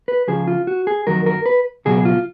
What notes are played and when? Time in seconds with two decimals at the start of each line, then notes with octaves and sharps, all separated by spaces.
0.08 B4
0.28 C#2 C#3 F3 G#4
0.48 F4
0.67 F#4
0.87 G#4
1.07 F2 D#3 F#3 A#4
1.26 A#4
1.46 B4
1.85 C#2 B2 F#3 G#4
2.05 F4